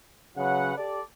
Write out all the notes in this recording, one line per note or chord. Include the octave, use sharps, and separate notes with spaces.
C#3 F#3 B4 F#5
G4 A4 D5